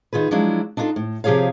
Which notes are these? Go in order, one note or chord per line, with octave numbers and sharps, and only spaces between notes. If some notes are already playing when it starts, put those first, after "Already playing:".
D#3 F4 G#4 B4
F3 F#3 G#3 D4 E4
D4 D#4 F4 G#4 A4
A2
C3 F3 G4 G#4 C#5 F5